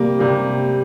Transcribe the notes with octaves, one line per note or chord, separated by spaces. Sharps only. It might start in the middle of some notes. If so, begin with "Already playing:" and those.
Already playing: C3 G3 A#3
C3 G3 A#3